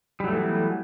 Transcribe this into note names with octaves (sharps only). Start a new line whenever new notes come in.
E3 F#3 G3 A3 B3